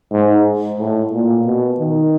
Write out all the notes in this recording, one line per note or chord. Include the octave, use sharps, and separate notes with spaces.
G#2
A2
A#2
B2
D#3